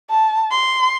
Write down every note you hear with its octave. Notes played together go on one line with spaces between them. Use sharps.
A5
C6